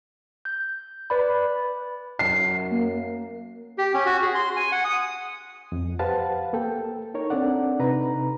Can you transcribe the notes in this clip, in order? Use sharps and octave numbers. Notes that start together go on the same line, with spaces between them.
G6
B4 D5 B5
F#2 C7
A#3
G4
C#4
F#4
G#4
C6
G#5
F#5
D#6
F2
G4 B4 C5 F5 F#5 A5
A#3 A4 G5
D#4 A#4 C#5
C4 D4 A4 D5 F#5
C3 D#4 B4 A#5